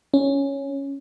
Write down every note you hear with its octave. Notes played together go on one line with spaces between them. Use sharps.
C#4